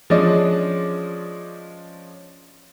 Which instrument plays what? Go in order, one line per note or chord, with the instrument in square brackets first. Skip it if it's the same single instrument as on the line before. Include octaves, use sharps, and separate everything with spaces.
[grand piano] F3 G#3 C#4 D4 D5 D#5